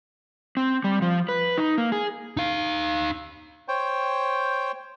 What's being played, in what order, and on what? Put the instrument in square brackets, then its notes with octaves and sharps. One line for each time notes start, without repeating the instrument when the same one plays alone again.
[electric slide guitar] C4
G3
F3
B4
D#4
A#3
G#4
[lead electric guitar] D#4 F5
[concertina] C5 C#5 G5